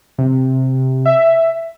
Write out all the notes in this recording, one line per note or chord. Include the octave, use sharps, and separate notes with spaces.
C3
E5